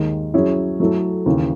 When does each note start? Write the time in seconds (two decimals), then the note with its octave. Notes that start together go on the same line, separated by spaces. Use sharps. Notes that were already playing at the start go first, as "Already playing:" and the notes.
Already playing: D#2 D#3 G#3
0.34 F#3 C#4 E4 G#4 C#5
0.80 F#3 A3 E4 A4
1.26 D#2 C#3 E3